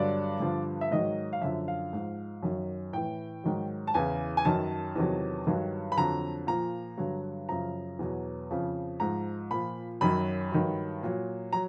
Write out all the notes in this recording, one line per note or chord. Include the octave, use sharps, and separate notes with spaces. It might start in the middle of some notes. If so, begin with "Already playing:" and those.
Already playing: G2 D3 F#3 D5
G2 D3 F3
E5
G#2 D#3 F#3 D#5
F5
F#2 D3 F3 E5
F5
G#2 F3
F#2 D#3 F#3
A2 E3 G5
G#2 D#3 F#3
A5
E2 C#3 E3 G#5
G#5
F#2 D#3 F#3 A5
E2 C3 D#3 F#3
G2 D#3 F#3
B5
F2 D3 F#3 A#5
A#2 F3 A#5
G2 D3 F#3
F#2 C#3 F3 A#5
E2 B2 F#3
F2 C#3 F3
G#2 F3 A#5
A#2 F3 B5
F#2 D#3 F#3 B5
G2 D#3 F#3
A#2 F#3
F#3 A#5